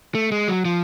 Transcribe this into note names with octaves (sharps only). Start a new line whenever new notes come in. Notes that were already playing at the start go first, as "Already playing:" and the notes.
A3
G#3
F#3
F3